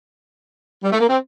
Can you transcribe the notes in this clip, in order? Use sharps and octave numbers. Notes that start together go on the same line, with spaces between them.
G3
A3
A#3
C4